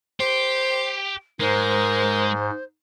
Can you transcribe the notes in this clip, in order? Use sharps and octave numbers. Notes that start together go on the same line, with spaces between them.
G4 C5
G#2 G#3 A#4 C5